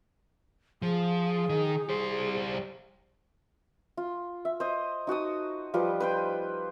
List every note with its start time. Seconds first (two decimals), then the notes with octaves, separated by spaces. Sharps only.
0.82 F3 G#4
1.50 D#3
1.89 G3 C5
3.97 F4
4.45 E5
4.60 C5 D#5
5.07 D#4 F#4 A5 D#6
5.74 F3 G3 F4 B4
6.00 B4 C5 G5